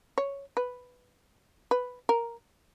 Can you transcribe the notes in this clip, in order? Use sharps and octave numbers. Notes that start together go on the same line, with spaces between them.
C#5
B4
B4
A#4